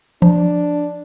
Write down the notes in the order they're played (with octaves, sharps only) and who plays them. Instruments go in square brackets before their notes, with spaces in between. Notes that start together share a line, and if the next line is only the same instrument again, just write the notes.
[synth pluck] F3 [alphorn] D4